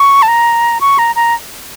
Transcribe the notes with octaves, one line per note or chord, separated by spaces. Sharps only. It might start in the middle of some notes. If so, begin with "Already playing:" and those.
Already playing: C#6
A5
A#5
C#6
A#5
A#5